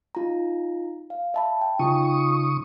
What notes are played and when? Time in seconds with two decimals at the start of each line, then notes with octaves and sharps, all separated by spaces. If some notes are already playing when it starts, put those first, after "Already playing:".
0.15 D#4 F4 A#5
1.10 F5
1.34 E5 A5 B5
1.61 G5
1.79 C#3 D#4 F4 G#5 C#6 D#6